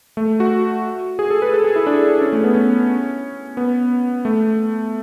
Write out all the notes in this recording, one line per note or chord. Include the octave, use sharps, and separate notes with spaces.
A3
F#4
G#4
A4
B4
A4
G#4
E4
D4
C#4
A3
B3
C#4
B3
A3